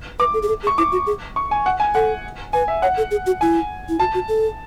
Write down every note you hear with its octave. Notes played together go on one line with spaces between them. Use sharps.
B4 D6
A4
G#4
A4
G#4
C#6
E4 D6
F#4
G#4
C#6
G#5
F#5
G#5
A4 F#5
B4 G#5
E5
C#5 F#5
A4
G#4
F#4
E4 G#5
E4
F#4 A5
F#4
A4